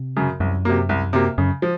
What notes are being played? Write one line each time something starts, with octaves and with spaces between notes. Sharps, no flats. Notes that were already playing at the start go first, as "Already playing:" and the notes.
Already playing: C3
F#2 C#3
C2 F#2
C3 F#3 A#3
C2
C3 F#3 A#3
F#2 C#3
F3